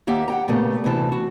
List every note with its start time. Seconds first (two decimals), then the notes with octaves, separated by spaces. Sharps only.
0.07 D#2 A#3 G4 E5 F#5
0.28 F#5 G5 A#5
0.48 A#2 C#3 A3 B3 G4
0.84 D2 C3 E3 A5
1.12 F#4